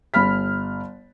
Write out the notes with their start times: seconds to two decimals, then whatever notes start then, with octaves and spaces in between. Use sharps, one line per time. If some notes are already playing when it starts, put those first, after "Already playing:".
0.14 G1 B5 F6 B6